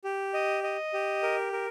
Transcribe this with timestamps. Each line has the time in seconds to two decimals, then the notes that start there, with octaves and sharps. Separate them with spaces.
0.04 G4
0.34 D#5
0.63 D#5
0.93 G4
1.23 A#4
1.53 A#4